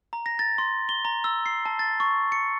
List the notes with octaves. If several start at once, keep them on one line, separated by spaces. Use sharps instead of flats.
A#5
A#6
A6
C6
G7
A#5
E6
C7
A5
A6
C#6
C#7